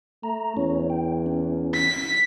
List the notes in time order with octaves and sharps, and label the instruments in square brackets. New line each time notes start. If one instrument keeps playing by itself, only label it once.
[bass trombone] A3 [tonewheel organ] A#5
[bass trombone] E2 [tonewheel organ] C#4 C#5
[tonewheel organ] G5
C#4
[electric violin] B6